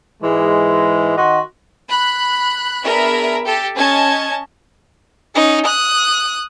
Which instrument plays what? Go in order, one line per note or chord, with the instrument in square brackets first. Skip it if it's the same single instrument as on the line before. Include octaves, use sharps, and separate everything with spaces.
[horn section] G#2 E3 G#3
D#3 F#4 D#5 F#5 C6
[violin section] B5 F#6
B3 D4 G#4 A#4 E5 B5
G4 A4
C#4 D#5 A5 G#6
[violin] C#4 D#4
D#6 F#6